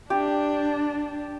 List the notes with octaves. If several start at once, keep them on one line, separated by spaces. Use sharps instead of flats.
D4 G4